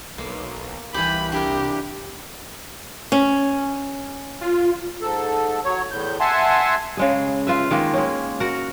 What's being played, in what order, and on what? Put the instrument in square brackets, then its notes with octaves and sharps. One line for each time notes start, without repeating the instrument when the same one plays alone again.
[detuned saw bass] B1 [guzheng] A#3
[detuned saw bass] C2 [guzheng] E3 G4 [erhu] B5
[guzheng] D4 E4 A#4 [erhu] G4
[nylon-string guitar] C#4
[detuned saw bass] F4
[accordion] G#2 A4
F#3 C#5
E2 A2 G6
E5 F#5 G#5 A5 C6
[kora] C#3 G#3 G#4
F4 B4 E5
D#3 G#3 A#3
G#3 C#4
F#4 A#4 F#5